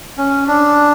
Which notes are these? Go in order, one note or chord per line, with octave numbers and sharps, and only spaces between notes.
C#4
D4